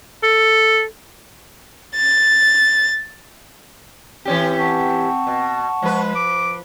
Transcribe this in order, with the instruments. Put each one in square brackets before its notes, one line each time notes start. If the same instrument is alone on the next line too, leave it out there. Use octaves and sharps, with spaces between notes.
[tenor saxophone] A4
[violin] A6
[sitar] E3 C#4 G4 [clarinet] C4
[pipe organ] F#5 A5 C#6
[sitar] B2
[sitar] F3 B4 [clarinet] G#3
[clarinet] D6